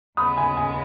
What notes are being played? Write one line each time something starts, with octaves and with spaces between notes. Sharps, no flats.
D#2 C#3 G#3 B3 B5 D#6
G#5 B5
G#5